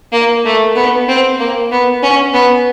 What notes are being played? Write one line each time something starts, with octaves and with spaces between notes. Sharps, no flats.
A#3
A3
B3
C4
A#3
B3
C#4
B3